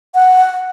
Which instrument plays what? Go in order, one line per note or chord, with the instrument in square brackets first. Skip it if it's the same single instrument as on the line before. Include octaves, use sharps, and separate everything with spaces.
[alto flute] F#5